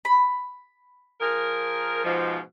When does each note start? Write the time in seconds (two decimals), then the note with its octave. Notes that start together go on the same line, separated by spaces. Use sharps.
0.05 B5
1.21 F3 G#4 A#4
2.04 G#2 B2 F3